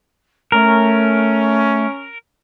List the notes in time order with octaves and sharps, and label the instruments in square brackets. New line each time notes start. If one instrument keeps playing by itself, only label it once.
[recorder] A3 [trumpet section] C#4 [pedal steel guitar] A#4